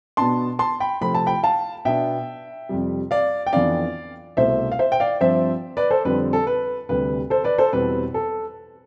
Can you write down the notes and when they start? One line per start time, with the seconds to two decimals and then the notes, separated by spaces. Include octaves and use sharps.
0.17 B2 B3 D4 A5 C6
0.59 A5 C6
0.80 G5 B5
1.01 C3 F3 A3 C4 B5
1.15 A5
1.26 G5 B5
1.43 F5 A5
1.85 B2 B3 D4 E5 G5
2.69 F2 C3 G3
3.11 D5 F5
3.47 G5
3.53 F2 E3 B3 D4 D5 F5
4.37 C2 B2 A3 C5 E5
4.72 F5
4.79 C5 E5
4.92 G5
5.00 D5 F5
5.21 G2 F3 C4 C5 E5
5.77 B4 D5
5.90 A4 C5
6.05 F2 D3 G3 C4 B4
6.33 A4
6.47 B4
6.89 D2 C3 G3 B4
7.30 A4 C5
7.44 B4 D5
7.58 A4 C5
7.73 E2 B2 G3 C4 B4
8.14 A4